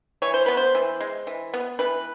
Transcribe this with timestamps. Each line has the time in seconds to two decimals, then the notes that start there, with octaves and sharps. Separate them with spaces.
0.22 E3 C#5
0.34 C5
0.46 B3 B4
0.57 C5
0.75 E3
1.00 G#3
1.27 E3
1.53 B3
1.79 E3 B4